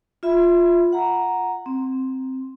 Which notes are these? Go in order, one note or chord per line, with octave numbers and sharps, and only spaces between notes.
F4 E5 B5
F#5 A#5
C4